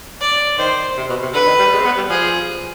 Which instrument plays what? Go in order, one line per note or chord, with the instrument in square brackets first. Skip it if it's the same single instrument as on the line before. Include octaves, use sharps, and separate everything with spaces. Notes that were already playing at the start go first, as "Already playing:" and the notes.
[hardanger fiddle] D5
[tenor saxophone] D#3 [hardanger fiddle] C5
[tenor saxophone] C3
B2
C3
[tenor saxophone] D3 [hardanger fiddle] B4
[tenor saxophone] D#3
G3
G#3
C4
B3
G3
[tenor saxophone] F3 [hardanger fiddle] G#4